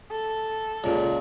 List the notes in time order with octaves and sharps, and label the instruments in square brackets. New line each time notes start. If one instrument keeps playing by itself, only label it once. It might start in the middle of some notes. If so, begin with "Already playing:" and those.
[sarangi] A4
[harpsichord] C#2 A#2